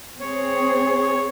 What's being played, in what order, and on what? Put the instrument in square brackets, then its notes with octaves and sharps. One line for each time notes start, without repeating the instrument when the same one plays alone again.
[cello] C4 G#4 [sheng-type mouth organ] C#5